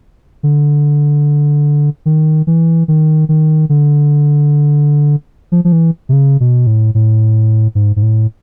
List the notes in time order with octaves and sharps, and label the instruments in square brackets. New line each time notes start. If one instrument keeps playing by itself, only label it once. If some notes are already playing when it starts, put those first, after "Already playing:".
[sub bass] D3
D#3
E3
D#3
D#3
D3
F3
F3
E3
C3
C#3
B2
A2
A2
G#2
G#2
A2